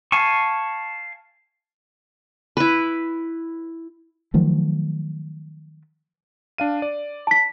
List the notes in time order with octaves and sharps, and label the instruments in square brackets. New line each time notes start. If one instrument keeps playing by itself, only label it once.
[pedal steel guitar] F5 G#5 A5 C#6
[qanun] E4 B4
[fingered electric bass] D#3 F3 F#3 A3
[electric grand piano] D4 F5 D#7
D5
[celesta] A5 B6